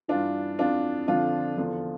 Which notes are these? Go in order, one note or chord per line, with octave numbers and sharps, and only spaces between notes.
G2 E3 D4 F4
F2 E3 D4 F4
F2 D3 F3 D4 F4
E2 D3 F3